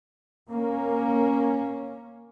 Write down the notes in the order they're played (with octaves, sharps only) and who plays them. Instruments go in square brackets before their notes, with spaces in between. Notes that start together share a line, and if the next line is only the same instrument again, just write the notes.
[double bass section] A#3 C#4